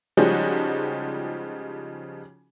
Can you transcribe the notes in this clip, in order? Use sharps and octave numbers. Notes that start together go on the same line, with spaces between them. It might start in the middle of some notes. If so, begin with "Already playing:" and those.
C#3 F3 G3 G#3 D#4 F#4